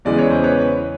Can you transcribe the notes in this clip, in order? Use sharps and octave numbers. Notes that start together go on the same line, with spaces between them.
E2 C#3 E3 G#3 D5
C#5
C5
B4 C#5